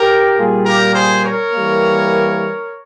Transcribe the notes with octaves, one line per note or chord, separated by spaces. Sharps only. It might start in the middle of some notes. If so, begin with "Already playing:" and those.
Already playing: G4 A#4
A#2 G3 A#3 F4 G#4
G4 A#4
G#4 C5
A#4 C#5
E3 G3 A#3